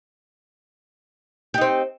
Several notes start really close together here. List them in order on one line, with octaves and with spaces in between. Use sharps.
G4 D#4 C4